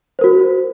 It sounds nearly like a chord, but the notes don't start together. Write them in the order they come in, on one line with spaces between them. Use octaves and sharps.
C5 A#4 F#4